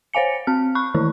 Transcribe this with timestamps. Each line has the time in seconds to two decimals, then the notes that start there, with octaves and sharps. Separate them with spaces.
0.14 C5 C#5 F5 G#5 C#7
0.47 C4 F6
0.75 B5 C#6 F#6
0.94 D#3 E3 E4